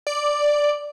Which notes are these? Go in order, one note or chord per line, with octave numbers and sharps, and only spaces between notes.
D5